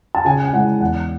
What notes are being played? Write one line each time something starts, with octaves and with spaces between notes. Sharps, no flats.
A5
C#3 G#5
G#5
G#3 C#4 E4 F#5
E2 F#5